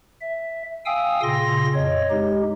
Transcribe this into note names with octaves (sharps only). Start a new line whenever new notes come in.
E5
F5 G5 G#5 D#6 E6
A#2 C#3 C6 A#6
F2 C#5 D#5
G#3 D#4 G4